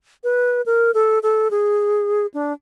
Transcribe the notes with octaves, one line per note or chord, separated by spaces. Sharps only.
B4
A#4
A4
A4
G#4
D4